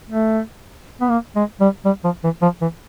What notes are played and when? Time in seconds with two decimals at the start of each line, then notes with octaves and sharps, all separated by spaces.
0.10 A3
1.01 B3
1.10 A#3
1.36 G#3
1.60 G3
1.85 G3
2.04 F3
2.23 E3
2.42 F3
2.61 E3